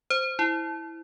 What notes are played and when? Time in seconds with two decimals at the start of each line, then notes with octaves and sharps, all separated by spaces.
0.10 C5
0.39 E4